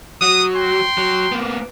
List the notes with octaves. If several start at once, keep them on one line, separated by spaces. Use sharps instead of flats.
F#3 D#6
G5 C6
F#3
A#3 B3